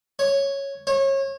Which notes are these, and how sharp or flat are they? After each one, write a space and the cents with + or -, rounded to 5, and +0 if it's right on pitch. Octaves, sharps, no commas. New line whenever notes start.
C#5 -5
C#5 -30